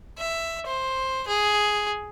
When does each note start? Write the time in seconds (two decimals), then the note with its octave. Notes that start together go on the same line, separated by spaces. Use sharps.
0.19 E5
0.66 C5
1.28 G#4